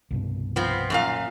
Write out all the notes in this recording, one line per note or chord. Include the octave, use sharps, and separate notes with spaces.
C2 G2 B2
F3 B3 C4
F#2 A#2 F5